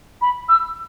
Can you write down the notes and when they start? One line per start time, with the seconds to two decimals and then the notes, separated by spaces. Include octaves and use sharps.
0.21 B5
0.48 E6